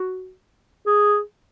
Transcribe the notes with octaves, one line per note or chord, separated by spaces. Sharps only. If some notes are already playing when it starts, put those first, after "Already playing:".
Already playing: F#4
G#4